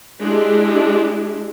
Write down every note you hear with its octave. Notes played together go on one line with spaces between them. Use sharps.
G#3 D4 E4 G4